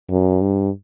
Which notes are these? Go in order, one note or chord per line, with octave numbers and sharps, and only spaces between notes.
F#2
G2